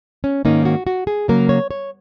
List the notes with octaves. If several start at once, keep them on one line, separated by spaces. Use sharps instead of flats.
C#4
G#2 D#3 A#3 C#4 D#4
F#4
F#4
G#4
C#3 F#3 A#3 A#4
C#5
C#5